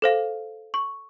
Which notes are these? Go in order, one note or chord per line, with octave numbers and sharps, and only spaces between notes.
A4 C5 F5
C#6